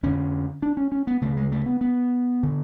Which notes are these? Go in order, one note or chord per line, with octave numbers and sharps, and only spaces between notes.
F2 D3 C#4
D4
C#4
C#4
B3
D2 C#3 A3
G#3
A3
B3
B3
D3